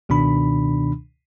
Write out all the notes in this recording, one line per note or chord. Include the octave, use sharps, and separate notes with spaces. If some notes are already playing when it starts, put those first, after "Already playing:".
C#2 B2 D#3 D4 B5